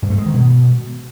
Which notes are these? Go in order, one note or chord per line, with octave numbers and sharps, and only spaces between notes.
G2
A3
G#3
D#3
B2